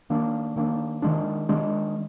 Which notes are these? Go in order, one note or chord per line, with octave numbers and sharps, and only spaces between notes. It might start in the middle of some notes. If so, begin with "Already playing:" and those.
D#3 A#3 D4
D#3 A#3 D4
D#3 G#3 D4
D#3 G#3 D4